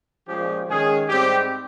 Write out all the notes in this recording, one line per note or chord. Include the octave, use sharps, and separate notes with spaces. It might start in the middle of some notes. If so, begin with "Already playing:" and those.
A#2 F3 G#3 C#4 G4
D#3 G#3 C#4 G#4
G#2 G3 C4 G4